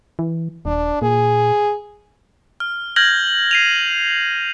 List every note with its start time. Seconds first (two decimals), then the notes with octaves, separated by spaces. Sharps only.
0.19 E3
0.65 D#1 D4
1.02 A#2 G#4
2.60 F6
2.96 F6 G6 G#6 A#6 F#7
3.51 C7 D#7 F7